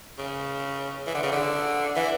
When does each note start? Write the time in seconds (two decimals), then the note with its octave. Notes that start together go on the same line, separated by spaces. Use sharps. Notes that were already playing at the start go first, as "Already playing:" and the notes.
0.18 C#3
1.07 E3
1.15 D3
1.23 C#3
1.32 D3
1.96 E3